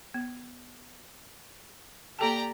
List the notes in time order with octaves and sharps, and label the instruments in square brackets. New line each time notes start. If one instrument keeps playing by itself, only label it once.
[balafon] B3
[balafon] A#3 A4 A5 [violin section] G4 D5 A#5